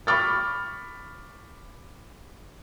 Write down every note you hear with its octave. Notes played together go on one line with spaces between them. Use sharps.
B5 C#6 D6 F6 A6